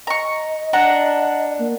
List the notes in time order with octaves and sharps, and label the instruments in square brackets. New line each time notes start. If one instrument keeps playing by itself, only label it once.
[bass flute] D#5 [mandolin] A#5 C#6
[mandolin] D4 F#5 A#5
[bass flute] A#3